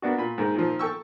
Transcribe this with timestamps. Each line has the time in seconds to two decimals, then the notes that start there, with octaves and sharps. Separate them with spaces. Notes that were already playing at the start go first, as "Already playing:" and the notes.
0.02 A#3 B3 D4 F#4
0.18 A#2 B5
0.38 G#2 D#3 G#3
0.55 A#2 D#3 F3
0.79 A4 G5 C#6 E6